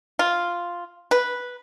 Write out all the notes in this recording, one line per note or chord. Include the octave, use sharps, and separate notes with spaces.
F4
B4